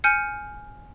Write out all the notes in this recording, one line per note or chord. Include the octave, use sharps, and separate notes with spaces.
G#5 F6 G6 C#7